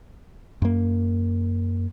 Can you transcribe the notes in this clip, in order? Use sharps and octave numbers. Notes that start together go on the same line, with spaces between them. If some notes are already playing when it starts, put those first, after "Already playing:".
F#2 A#3